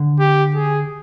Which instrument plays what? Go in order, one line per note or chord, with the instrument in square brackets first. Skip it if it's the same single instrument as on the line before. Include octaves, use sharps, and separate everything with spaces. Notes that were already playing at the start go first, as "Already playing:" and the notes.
Already playing: [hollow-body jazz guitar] D3
[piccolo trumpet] G4
G#4